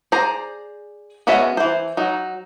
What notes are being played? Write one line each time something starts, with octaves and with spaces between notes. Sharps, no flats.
G#4 C5 D5 A#5
G#3 B3 C#4 F#4 E5
E3 C5
F#3 D#4